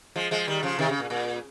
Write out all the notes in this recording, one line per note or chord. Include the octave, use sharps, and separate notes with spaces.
F3 G#3
F3 G#3
D#3 G3
C#3 F3
C3 D#3
C#3
A#2
A#2